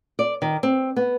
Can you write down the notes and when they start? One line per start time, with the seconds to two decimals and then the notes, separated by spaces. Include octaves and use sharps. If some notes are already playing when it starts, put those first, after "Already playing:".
0.19 D5
0.42 D#3
0.63 C4
0.96 B3